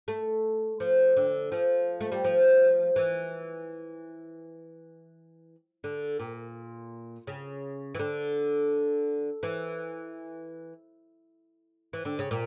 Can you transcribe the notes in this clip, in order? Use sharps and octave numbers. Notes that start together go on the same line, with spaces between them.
A3
F3
D3
F3
A3
G3
F3
E3
D3
A#2
C#3
E3
D3
E3
E3
D3
C#3
A#2